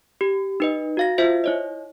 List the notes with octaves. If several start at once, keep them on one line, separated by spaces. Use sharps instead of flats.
G4
D#4 B4 D#5
F#4 F5 A#6
F4 C5 E5
E4 C#5 D#5